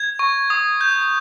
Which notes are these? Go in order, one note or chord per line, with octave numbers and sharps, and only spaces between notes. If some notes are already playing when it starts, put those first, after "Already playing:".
Already playing: G#6
C#6
D#6
G6